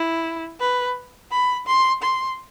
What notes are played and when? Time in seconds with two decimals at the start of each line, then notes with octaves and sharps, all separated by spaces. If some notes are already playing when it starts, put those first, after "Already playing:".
Already playing: E4
0.60 B4
1.31 B5
1.67 C6
2.02 C6